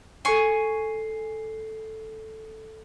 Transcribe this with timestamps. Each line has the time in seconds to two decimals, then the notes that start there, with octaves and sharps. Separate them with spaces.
0.25 A4 G#5 C#6 C7